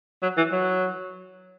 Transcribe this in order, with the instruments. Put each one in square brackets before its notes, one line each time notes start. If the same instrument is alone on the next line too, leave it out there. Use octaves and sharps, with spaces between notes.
[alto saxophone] F#3
E3
F#3